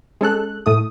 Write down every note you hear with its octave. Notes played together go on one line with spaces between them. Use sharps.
G#3 C#4 A4 F#6
A2 A3 D#6